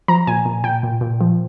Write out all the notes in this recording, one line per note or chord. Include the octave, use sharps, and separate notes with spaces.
F3 A#5
A#2 G#5
A#2
A#2 G5
A#2
A#2
F3